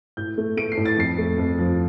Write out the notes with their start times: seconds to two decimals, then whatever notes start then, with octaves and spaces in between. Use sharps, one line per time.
0.17 A2 G6
0.38 A3
0.57 A3 D7
0.72 C7
0.77 A2
0.85 A6
0.97 F2 C7
1.18 A3
1.38 F2
1.59 F3